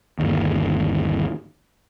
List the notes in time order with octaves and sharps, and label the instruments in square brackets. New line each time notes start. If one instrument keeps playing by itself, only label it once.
[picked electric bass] G1 D#2